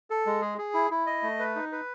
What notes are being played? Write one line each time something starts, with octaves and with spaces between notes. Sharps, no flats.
A4
G#3
G#4
G#4
E4
E4
D#5
A3
B4
D#4
B4